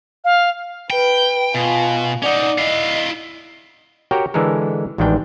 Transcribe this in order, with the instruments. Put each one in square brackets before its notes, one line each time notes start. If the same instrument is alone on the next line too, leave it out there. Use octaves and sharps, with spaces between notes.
[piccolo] F5
[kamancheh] B4 [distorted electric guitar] G5
[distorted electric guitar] B2 [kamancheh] F4 G#5
[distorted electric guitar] C#4 D#4 [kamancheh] D5 F#5
[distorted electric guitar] E4 F5 [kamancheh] D#5
[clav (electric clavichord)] F#4 G4 A#4 C#5 G5
D3 E3 G#3 A4 A#4
A1 G#2 D#3 E3 D4 G5